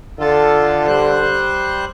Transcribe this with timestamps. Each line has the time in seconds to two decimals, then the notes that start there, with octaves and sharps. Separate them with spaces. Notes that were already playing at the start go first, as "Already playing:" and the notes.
0.19 D3 F4 A4
0.87 G3 C5 F#6